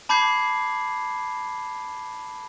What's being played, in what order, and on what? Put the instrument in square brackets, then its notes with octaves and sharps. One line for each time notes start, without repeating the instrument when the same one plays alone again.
[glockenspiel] A5 B5 D6 G6 G#6 C7